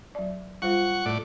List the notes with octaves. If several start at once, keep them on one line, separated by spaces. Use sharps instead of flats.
F#3 D5
G3 F4 C5 F#5 C#6
A2 D5